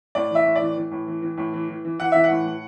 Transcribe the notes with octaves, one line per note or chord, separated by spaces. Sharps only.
A2 D5
E3 E5
A2
D5
E3
E3
A2
E3
E3
A2
E3
E3
E3
E3 F#5
E3 E5
F#5
A2
A2